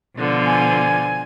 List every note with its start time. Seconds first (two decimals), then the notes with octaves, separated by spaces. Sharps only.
0.17 B2 D3 F3
0.46 G#5